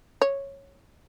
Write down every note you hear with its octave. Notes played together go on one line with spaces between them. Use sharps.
C#5